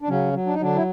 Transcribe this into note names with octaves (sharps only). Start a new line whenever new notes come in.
D4
C#3 F#3 C#4
F#3
D4
D#4
D3 F#3 D4
E4